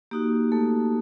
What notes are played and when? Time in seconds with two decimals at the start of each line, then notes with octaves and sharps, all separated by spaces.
0.11 A#3 D#4 F#4 G4
0.52 A3 A4